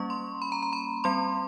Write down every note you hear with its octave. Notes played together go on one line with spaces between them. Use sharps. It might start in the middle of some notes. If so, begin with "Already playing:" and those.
Already playing: G3 A#3 C#4 C#6
C6
B5
A#5
A#5
B5
G3 C4 C6